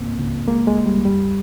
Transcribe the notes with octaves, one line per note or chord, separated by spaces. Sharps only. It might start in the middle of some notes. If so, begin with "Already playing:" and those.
Already playing: C#2 G#2 A#3 C4
C#2
C2 G#3 A#3
G#3
C2
G3
F#2 G3